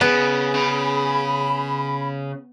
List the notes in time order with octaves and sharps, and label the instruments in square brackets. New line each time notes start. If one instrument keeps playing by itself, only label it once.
[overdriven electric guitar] C#3 [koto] B3 [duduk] G#4
[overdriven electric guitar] C#3 [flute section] B5